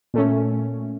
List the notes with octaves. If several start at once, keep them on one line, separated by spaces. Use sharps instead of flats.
A#2 A3 C#4